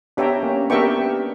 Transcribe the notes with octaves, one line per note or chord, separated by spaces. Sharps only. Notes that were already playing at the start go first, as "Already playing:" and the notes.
B3 D4 G4 C#5 E5 G5 A#5
A#3 C#4
B3 D4 G4 A#4 E5 G5 C#6